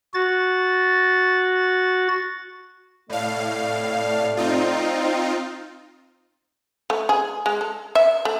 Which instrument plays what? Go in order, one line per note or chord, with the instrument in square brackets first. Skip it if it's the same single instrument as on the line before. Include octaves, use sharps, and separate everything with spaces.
[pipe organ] F#4 A6
[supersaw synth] A2 F5 [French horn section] C3 A3 D5
[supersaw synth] C4 D#4 F4
[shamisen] A3
G#4
G#3
A4
E5
A3